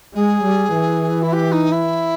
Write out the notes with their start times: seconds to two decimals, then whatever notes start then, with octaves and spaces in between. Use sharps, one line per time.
0.14 G#3 G#4
0.44 G3
0.73 E3
1.22 E4
1.33 G4
1.52 D#4
1.72 E4